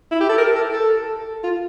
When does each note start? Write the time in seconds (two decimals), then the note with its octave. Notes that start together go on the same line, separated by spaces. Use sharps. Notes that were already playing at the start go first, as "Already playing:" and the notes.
0.11 E4
0.20 G4
0.29 A4
0.38 A#4
0.56 A4
0.73 A4
1.44 F4